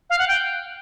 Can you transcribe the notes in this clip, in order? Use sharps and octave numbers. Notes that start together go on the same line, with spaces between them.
F5
F#5
G5